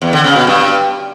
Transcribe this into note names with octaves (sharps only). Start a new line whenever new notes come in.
E2
D3
C#3
B2
G2